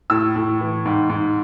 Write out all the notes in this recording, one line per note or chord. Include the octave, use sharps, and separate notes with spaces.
A2 E6
A2
E3
G#2
G#2